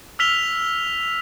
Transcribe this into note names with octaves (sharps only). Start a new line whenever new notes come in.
E6 F6 B6 F7 G7